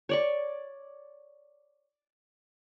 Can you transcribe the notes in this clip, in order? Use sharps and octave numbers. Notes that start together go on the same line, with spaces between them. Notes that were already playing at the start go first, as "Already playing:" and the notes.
C#5 D5 C#6